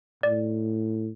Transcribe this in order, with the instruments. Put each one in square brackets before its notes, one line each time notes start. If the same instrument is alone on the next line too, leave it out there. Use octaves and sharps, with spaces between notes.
[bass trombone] A2 [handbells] D5